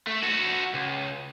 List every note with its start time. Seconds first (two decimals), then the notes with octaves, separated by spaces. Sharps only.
0.07 A3
0.23 F#4 A4
0.74 C#2